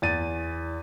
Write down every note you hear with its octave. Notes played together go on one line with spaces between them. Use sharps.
E2 A6 D#7